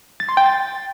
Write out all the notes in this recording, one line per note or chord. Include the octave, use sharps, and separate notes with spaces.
A6
C6
G5
A6